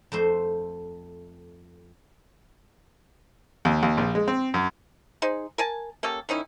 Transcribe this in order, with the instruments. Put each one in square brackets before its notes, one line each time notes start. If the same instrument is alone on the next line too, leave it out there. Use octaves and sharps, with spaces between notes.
[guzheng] F2 A3 C5
[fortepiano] D#2
D#2
A#1
G#3
C4
F#2
[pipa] D#4 G#4 C5
A#4 G#5 A5
A#3 C#4 G4 A4
D#3 C#4 D#4 E4